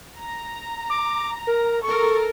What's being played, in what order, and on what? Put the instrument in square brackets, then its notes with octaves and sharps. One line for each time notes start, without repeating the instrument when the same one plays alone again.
[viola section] A#5
[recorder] D6
A#4
[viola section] A4 A#4 [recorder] C#6